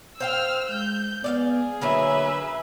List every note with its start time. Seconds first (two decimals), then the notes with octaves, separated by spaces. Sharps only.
0.20 C5 F5 G5 E6 F6
0.69 G#3 G6
1.24 B3 G#4 D5 E5 F5
1.81 D3 F#3 A#3 A#4 B4 E5